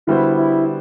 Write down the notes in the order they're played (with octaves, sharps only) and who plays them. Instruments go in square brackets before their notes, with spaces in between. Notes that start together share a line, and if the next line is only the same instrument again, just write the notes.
[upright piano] D3 G3 B3 F#4 C5 [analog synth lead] E4
[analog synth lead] E4